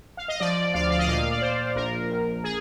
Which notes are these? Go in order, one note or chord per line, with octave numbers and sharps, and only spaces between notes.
F5
D#5
F3 D5
D2 F5
D5
D#5
A#2 F5
D5
A#2 C5
A#1 A#4
A#1
G#4